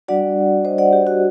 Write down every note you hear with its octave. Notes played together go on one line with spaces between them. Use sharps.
G3 D4 F#4 D5 F#5
C5 D#5
D5 F#5
G4
F#4